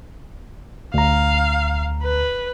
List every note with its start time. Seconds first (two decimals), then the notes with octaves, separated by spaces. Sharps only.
0.94 D2 F5 A#5
2.02 B4